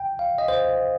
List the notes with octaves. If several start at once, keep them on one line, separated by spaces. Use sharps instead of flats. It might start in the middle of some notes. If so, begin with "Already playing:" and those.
Already playing: G5
F5
D#5
C5